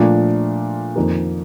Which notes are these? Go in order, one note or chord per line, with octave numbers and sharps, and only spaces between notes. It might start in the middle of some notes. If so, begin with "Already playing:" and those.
Already playing: A#2 F3 A3 D4 F4
F2 D#3 A#3